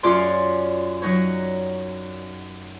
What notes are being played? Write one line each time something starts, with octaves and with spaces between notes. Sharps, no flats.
F#2 F4 G#4 C#5 D5 C6
F#3 D#4 C#5